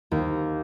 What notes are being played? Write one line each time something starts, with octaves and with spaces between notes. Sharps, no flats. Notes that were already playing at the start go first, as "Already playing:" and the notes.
D#2